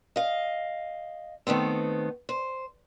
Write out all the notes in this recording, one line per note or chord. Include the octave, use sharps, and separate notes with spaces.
D#5 F5
D#3 A3 B3 C4
C5